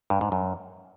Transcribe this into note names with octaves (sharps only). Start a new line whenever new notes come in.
G2
G#2
F#2